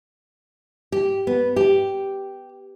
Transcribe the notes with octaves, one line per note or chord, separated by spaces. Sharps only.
G4
B3
G4